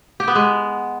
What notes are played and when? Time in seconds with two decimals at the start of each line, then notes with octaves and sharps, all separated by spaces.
0.20 G4
0.28 B3
0.35 G#3